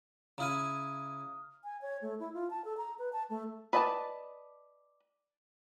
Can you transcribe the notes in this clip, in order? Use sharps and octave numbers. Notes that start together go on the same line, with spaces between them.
C#3 E4 G#5 A#5 D#6 F6
G#5
C#5
A3
E4
F4
A5
A4
A#5
B4
A5
A3
B4 D5 D#5 G#5 A5